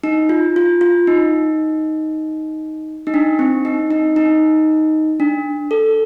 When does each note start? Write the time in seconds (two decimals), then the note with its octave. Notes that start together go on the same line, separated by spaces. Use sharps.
0.04 D#4
0.29 F4
0.56 F4
0.81 F4
1.07 D#4
3.07 D#4
3.14 D4
3.39 C4
3.65 D#4
3.91 D#4
4.16 D#4
5.20 D4
5.71 A4